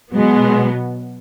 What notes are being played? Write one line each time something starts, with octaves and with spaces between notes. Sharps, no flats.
B2 F#3 G#3 B3